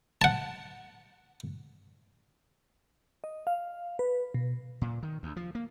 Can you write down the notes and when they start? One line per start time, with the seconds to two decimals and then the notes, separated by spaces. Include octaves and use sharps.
0.22 F#5 A5
3.24 D#5
3.47 F5
3.99 B4
4.34 B2
4.82 A#2
5.03 D#3
5.23 D2
5.36 F3
5.55 A#3